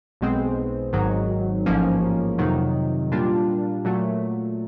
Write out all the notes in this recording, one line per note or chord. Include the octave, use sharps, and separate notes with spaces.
B1 B2 G#3 C4
G#1 G#2 D#3 F#3
A1 G#2 F3 A#3 C#4
F2 C3 D#3 F#3
A#2 G3 A#3 D4 F4
A#2 F#3 A3